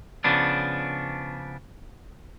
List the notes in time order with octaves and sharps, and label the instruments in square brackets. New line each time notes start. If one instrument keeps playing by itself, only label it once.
[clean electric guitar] C#3 F3 B3 D4